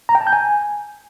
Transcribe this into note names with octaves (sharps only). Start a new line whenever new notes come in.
A#5
G5
A5
G6
G#5